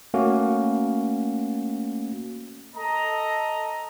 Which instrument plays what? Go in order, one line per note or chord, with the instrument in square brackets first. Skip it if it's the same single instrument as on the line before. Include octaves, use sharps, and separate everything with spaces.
[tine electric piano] A3 A#3 C#4 F#4
[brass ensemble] A4 D#5 A#5